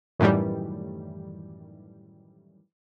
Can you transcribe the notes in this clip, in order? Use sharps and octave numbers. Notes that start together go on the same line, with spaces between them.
F#2 A2 D#3 E3 G3